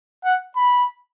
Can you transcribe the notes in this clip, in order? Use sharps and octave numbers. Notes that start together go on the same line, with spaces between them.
F#5
B5